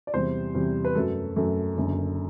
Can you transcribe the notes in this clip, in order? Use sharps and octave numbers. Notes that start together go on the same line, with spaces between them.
D5
E2 C3 G3 C5
E2 C3 G3
B4
F#2 F#3 A3 A4
F#2 F#3 A3
F#1 F#2 D3